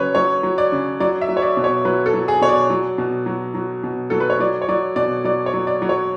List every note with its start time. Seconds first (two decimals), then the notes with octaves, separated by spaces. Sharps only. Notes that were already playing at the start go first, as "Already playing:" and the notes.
Already playing: C#3 F#3 B4 C#5
0.15 F#3 C#5
0.43 F#3
0.58 D5
0.72 C#3
1.00 F#3 D5
1.21 E5
1.29 F#3
1.37 C#5
1.42 D5
1.57 B2
1.64 C#5
1.85 F#3 B4
2.06 A4
2.14 F#3
2.28 G#4
2.41 B2 C#5
2.49 D5
2.70 F#3
2.98 B2
3.26 F#3
3.55 F#3
3.83 B2
4.10 F#3 A4
4.20 B4
4.30 C#5
4.40 F#3 D5
4.62 C#5
4.69 F#3 D5
4.96 B2 D5
5.24 F#3 D5
5.46 C#5
5.53 F#3
5.67 D5
5.82 F#3
5.89 C#5